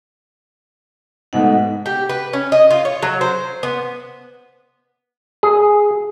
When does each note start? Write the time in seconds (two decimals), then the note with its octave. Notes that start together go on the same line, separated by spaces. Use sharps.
1.33 G#2 B2 A3 F#5
1.86 G4
2.09 B4
2.33 C#4
2.52 D#5
2.71 F4
2.85 C#5
3.02 F#3
3.21 C5
3.63 B3
5.43 G#4